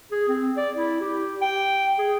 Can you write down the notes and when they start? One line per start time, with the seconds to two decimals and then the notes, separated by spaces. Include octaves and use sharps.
0.11 G#4
0.28 C4
0.57 D5
0.76 E4
1.01 G4
1.41 G5
1.98 G#4